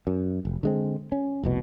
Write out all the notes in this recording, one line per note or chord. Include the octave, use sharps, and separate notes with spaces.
F#2
F1
D3 G#3 C4
C#4
F1 C2 B2